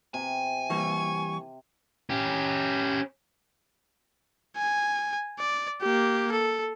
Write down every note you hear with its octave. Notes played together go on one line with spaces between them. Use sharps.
C3 G#5
E3 G3 A#3 C#6
C#4 G4
G#5
D5
A#3 G4
A4